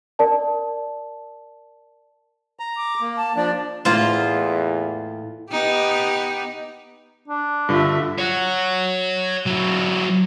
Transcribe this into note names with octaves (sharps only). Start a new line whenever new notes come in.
A#4 D5 A5
A#5
D6
A#3
A5
F3 D4 D5
E2 A2 A#3 F4 C5
B3 D#4 G4
D4
G2 D3 F4 E5
C#5 F#5
F#3 E4